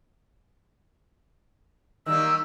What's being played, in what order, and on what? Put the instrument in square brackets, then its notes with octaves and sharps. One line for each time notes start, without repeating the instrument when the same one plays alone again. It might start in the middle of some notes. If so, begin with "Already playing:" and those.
[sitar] D#3 G3 A#3 [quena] E6